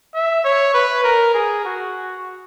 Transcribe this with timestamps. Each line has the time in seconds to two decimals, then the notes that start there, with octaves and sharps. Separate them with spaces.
0.15 E5
0.44 C#5
0.74 B4
1.04 A#4
1.34 G#4
1.65 F#4